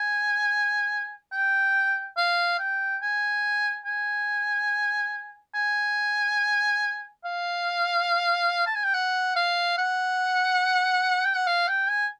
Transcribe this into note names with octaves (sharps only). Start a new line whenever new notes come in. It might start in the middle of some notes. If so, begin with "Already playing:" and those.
Already playing: G#5
G5
F5
G5
G#5
G#5
G#5
F5
A5
G#5
G5
F#5
F5
F#5
G5
F#5
F5
G5
G#5